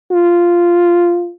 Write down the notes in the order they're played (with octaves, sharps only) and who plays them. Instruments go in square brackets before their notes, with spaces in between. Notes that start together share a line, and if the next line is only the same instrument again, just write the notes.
[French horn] F4